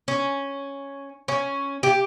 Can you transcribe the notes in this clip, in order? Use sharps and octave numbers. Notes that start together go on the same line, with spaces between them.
C#4
C#4
G4